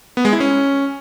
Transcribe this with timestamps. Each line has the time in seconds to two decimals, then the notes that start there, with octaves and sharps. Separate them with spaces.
0.17 B3
0.25 G#3
0.33 E4
0.40 C#4